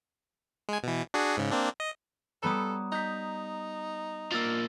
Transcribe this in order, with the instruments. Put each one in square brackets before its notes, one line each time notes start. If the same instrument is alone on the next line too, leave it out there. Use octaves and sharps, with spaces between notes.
[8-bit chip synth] G#3 G#5
B2 E3
D4 F#4 G#4
G#2 C#3
A#3 C4 D4
D#5
[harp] G3 B3 C#5 [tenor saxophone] A4 [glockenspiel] A#5 D#6
[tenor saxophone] D#4 [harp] G6 B6
[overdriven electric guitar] F3 A#3 [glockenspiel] E6 F6 A6